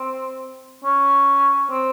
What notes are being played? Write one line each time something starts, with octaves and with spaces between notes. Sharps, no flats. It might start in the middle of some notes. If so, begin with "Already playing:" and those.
Already playing: C4
C#4
C4